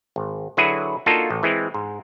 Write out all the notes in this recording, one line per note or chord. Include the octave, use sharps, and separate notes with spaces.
G#1
D3 F#3 E4 F#4 G#4 B4
A#3 D4 D#4 F4 F#4 A4
A1
E3 G#3 C4
G#2